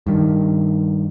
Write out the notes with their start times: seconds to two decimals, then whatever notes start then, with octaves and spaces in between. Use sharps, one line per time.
0.07 G2 D#3